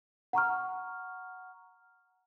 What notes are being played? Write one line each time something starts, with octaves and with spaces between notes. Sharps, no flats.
F#5 A#5 C#6 F6